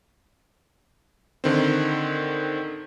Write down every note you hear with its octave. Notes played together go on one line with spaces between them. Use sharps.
D3 D#3 C4